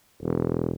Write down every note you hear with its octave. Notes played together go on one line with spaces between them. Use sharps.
E1